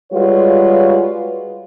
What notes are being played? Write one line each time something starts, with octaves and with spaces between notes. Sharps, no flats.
G3 G#3 F4 F#4 B4 C#5